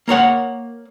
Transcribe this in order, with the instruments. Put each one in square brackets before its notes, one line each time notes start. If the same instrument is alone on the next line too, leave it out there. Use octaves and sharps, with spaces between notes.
[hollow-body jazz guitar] A#3 A#4 C#5 F#5